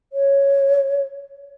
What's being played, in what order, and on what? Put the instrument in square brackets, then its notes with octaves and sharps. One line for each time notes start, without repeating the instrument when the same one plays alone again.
[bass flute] C#5